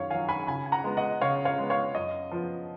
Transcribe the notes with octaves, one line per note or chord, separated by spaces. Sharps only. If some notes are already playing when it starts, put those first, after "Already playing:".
Already playing: F#2 D#3 F#3 C#5 F5
D#3 F#3 F5 G#5
G#5 B5
C#3 G#5 B5
G#5
F#5 A#5
G#3 B3
D#5 F#5
C#3 C#5 F5
C#5 F5
G#3 B3
C#5 F5
F#2 D#5
F3 B3